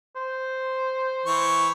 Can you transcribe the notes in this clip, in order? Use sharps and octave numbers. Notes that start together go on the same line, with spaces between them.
C5
E3 C#6